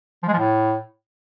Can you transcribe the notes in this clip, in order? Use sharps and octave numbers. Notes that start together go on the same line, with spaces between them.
F3
G#3
F3
A2